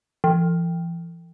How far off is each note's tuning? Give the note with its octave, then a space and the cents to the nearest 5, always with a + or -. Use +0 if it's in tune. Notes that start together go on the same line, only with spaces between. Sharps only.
E3 +45